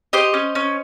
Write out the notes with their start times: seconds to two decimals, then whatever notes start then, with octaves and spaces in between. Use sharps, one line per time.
0.13 G4 C5 D#5
0.34 C#4
0.55 C#4